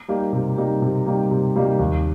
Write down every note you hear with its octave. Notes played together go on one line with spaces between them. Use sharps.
G3 A#3 D#4 G4
C3
G3 A#3 D#4 G4
C3
G3 A#3 D#4 G4
C3
G3 A#3 D#4 G4
D#2